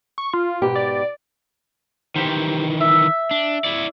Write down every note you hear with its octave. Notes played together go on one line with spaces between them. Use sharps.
C#6
F4
G#2 B2 G4
D5
D#3 E3 G4 C5
E5
D4
E4 D5